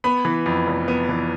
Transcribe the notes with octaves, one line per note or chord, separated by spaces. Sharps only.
B3 B5
E3
F2
F1
B3
E3